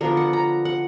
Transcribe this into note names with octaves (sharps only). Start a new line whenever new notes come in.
D3 F3 B3 D4 A#4
F#5
A#5
F#5